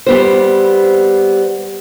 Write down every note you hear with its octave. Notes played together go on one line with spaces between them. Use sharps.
G3 B3 C5